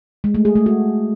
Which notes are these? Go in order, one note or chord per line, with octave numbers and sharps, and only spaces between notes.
G#3
A3
G#4
A3
F#4